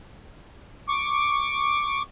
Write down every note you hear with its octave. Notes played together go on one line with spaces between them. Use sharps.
C#6 D6